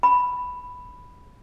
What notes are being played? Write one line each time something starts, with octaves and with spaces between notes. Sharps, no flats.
B5